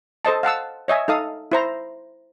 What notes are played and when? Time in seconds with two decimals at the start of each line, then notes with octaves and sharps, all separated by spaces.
0.25 A4 C5 D#5 A5
0.43 F5 F#5 A5 E6
0.88 C#5 D#5 E5 G#5
1.08 D#4 A4 F5 D#6
1.52 E4 C5 A#5